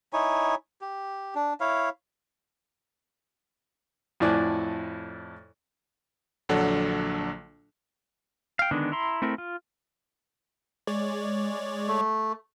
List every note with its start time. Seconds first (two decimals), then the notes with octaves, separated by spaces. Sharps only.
0.13 D#4 E4 C#5 G#5
0.81 G4
1.35 D4
1.60 E4 C#5 F5
4.20 F2 A2 E4 D5 G#5 F#6
6.49 A#1 D3 F#3 D4 A4 F#5
8.59 F5 G5
8.71 D3 D#3 G#3 B3 D4
8.92 E4 A#5 C6
9.22 A3 C4 E4 A#4
9.38 F4
10.87 G#3 C#5 D5
11.87 A3